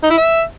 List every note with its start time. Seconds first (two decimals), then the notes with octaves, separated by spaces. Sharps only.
0.03 D#4
0.10 E4
0.18 E5